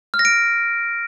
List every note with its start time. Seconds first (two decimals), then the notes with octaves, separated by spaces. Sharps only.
0.14 F6
0.19 A#6
0.25 D7